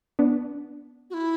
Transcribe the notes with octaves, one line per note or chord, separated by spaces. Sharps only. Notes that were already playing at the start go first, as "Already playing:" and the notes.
B3 D4
F#4
E4